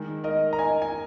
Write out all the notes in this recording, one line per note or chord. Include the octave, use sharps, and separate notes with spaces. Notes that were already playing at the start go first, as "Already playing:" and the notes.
Already playing: D#3 G#3 A#4
A#4 D#5
A#5
D#5 G#5
G#5